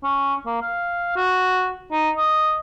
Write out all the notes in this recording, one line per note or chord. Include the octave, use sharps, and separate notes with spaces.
C#4
A#3
F5
F#4
D#4
D#5